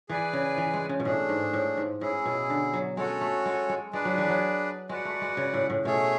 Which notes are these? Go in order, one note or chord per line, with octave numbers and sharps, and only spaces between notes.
E3 G#4 B4 D5 G#5
C#3
E3
G#3
C#3
B2
A2 A3 D4 G#4
G#2
A2
G#2
A2 C#4 E4 G#4
B2
D3
F#3
G#3 C#4 F#4 A4 C#5
A3
G#3
G#3
G#3 D4 G#4 B4 D5
F#3
E3
F#3
G#3 F#4 B4 D5 F#5
A3
G#3
C#3
A2
A2
B2 A3 C#4 G#4 C#5 E5